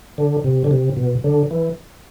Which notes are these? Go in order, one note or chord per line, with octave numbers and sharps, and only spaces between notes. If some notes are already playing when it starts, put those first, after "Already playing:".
D3
C3
D3
C3
B2
D3
E3